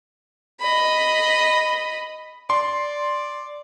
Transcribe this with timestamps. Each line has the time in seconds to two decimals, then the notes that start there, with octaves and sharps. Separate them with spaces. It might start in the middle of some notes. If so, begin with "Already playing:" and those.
0.60 D#5 B5
2.50 D5 C6